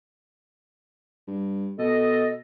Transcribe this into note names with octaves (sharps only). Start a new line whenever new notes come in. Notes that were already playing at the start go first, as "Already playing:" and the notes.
G2
B2 A4 D#5